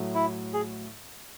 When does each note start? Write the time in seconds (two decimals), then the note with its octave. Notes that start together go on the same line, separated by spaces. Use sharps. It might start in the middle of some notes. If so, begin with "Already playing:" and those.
Already playing: A2 F#3 A3
0.15 E4
0.54 G#4